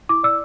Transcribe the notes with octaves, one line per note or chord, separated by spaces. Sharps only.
E4 D6
D5 E6